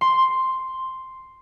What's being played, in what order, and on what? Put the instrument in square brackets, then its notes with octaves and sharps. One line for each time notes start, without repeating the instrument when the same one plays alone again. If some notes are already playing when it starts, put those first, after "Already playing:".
[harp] C6